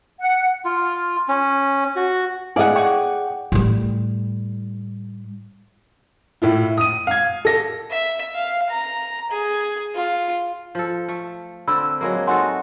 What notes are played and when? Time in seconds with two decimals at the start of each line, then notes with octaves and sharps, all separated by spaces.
0.19 F#5
0.65 F4
1.28 C#4
1.96 F#4
2.56 E4 G#4 D5 D#5 F5 F#5 G#5
2.76 F#5 G5 C#6
3.52 A2 G3
6.42 A2 E4 F4
6.78 D#6 D#7
7.07 F5 G#6
7.45 A4 A#6
7.90 E5
8.34 F5
8.70 A#5
9.31 G#4
9.95 F4
10.75 F3 A4
11.09 A3
11.68 D3 C4 B5 E6
12.01 F#3 G#3 A#3
12.27 D#4 F#4 A4 F#5 G#5 C6